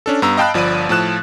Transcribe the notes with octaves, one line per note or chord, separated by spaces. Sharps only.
C#4 D4 A4
G2 B3 A#5 E6
D#5 F5 G5 A5 B5 F#6
G1 F3 D5 B5 D#7
A2 F3 A5 F#6 E7